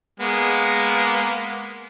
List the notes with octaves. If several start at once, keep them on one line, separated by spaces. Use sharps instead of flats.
G#3 A#3 B3